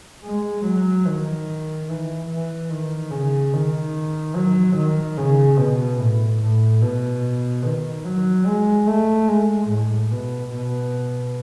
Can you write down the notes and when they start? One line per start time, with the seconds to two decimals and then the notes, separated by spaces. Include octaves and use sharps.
0.25 G#3
0.65 F#3
1.07 D#3
1.89 E3
2.29 E3
2.70 D#3
3.11 C#3
3.54 D#3
4.36 F#3
4.76 D#3
5.18 C#3
5.58 B2
6.00 A2
6.41 A2
6.82 B2
7.65 D#3
8.06 F#3
8.46 G#3
8.88 A3
9.28 G#3
9.69 A2
10.12 B2
10.53 B2